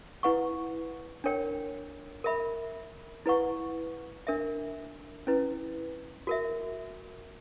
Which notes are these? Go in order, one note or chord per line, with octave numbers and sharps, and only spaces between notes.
E4 B4 F#5 C#6
D4 A#4 C#5 G5
A#4 E5 B5
E4 B4 F#5 C#6
D4 A#4 E5
C#4 E4 B4
F#4 A#4 E5